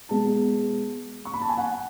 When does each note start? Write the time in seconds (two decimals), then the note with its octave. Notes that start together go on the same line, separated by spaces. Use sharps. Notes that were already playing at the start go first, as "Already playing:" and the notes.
0.09 B2 G#3 B3 A5
1.25 C#6
1.34 B5
1.42 A5
1.49 G#5
1.57 F#5